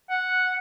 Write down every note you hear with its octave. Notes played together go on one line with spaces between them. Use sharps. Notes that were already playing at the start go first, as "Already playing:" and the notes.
F#5